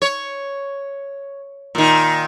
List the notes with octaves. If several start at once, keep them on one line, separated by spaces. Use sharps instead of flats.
C#5
A#2 D#3